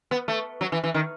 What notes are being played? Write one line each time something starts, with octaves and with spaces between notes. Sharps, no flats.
B3
A3
F#3
E3
E3
D#3